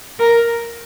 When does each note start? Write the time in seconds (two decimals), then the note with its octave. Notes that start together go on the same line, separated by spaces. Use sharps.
0.19 A#4